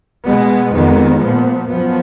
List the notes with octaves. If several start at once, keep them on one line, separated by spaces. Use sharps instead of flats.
B2 G#3 B3
F2 D#3 G#3 B3
A#2 F3 B3
F#2 F3 B3